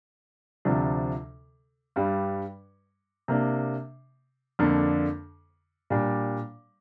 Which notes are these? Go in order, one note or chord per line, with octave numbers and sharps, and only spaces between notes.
D2 C3 F3 D4
G2 G3 D4
C3 A#3 D4
F2 D3 A#3 D4
A#2 G3 D4